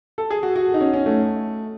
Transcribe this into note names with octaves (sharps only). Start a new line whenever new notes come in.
A4
G#4
F#4
F#4
D#4
C#4
C#4
A3